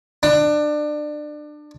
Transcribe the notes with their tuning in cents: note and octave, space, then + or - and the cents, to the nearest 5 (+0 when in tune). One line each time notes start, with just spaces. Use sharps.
D4 +25